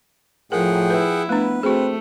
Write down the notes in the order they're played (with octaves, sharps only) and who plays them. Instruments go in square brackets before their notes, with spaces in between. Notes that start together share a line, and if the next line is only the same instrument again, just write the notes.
[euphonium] A2 [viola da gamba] F3 [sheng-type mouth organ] G#4 F#5 G5 [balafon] A#4
[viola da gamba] E4 [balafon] B4
[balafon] A3 D4 [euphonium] B3 [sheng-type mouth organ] B4
[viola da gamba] A3 [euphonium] C4 [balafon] F#4 G#4